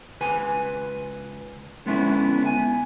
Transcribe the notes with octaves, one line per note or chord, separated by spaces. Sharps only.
C#2 B4 G#5
D3 G#3 B3 C#4 E4
G#5